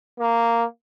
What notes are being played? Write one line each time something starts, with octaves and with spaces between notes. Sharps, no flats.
A#3